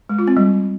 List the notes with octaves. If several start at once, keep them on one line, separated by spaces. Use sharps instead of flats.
G#3
F4
C4
G3